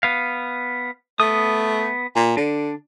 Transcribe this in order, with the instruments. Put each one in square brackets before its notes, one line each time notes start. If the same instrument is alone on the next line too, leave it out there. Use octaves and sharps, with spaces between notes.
[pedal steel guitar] B3 F5
[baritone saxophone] A3 [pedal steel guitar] B3 D#6
[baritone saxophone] A#2
[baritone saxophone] D3 [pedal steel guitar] D4